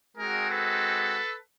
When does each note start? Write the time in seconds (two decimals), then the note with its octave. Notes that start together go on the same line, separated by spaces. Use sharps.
0.17 G#3 C4 D#4 F#4 G#4 A#4
0.49 A4 B4